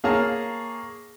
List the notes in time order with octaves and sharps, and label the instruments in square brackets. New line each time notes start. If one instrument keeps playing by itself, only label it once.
[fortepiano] A#3 G#4 C#5 A5 A#5 F6